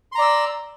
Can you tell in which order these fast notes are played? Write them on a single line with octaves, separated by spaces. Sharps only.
C6 A#5 D5 E6